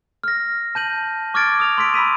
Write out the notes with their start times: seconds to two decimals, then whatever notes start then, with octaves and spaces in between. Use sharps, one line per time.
0.24 F6 A#6
0.75 A5 G6 D#7 F#7
1.34 C#6 D6 F6 G#6 A6 D7
1.60 D#6 F7
1.78 C6 E6 B6 D7
1.94 B5 E6 B6 D#7